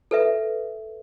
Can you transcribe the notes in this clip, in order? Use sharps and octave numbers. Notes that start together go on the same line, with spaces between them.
A4 B4 E5